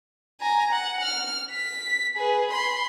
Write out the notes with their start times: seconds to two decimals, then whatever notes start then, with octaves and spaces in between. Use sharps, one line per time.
0.41 G#5 A#5
0.72 F#5
1.03 F6
1.51 B6
2.16 G#4 B4
2.51 B5 C6